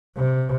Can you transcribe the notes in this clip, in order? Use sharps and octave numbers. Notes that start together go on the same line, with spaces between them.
C3